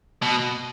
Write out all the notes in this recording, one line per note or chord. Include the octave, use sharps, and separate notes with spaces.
B2